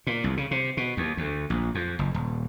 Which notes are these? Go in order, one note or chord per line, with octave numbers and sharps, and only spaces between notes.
A#2
C2
C#3
C3
B2
D#2
D2
A#1
F2
F#1
D#1